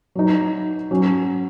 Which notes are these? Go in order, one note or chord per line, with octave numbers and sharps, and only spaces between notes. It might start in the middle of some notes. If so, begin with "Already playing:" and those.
F#3 D#4
F#3 C#4